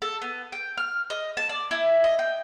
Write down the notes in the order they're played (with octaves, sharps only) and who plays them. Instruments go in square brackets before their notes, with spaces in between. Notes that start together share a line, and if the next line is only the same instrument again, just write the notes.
[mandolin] A4
B3
G5
F6
D#5
A5
D5
E4
D#5
G5